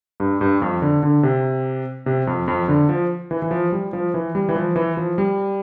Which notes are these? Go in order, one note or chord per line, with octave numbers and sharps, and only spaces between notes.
G2
G2
F2
D3
D3
C3
C3
F2
F2
D3
F3
E3
E3
F3
G3
F3
E3
G3
E3
F3
E3
F3
G3